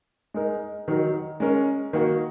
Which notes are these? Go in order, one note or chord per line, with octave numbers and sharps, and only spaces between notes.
G#3 D#4 A#4
D#3 F#3 D#4 A#4
G#3 C#4 A#4
D#3 A#3 F#4